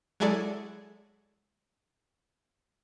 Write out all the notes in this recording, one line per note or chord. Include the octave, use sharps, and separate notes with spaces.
F#3 G#3 E4 G#4 A4 D5